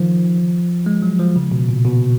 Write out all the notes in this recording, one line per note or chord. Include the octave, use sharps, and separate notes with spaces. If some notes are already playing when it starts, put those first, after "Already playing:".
Already playing: D#3 F3
G#3
F#3
F3
C#3
B2
A#2
B2